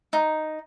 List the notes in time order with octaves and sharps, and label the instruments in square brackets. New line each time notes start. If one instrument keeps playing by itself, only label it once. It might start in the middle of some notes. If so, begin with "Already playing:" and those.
[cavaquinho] D#4